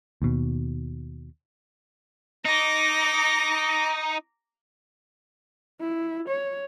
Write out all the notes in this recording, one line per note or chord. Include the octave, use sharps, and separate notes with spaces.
D#2 B2
D#4 A#5 D6
E4
C#5